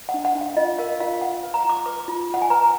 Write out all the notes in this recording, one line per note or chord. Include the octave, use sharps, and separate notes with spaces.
F#5
D4
F#5
D4
F5
F4 D#5
A#4 F5
F4 F5
F4 F#5
B4
A#5
F4
D6
B4 D6
F4
F4 F#5
G#5
B4 A#5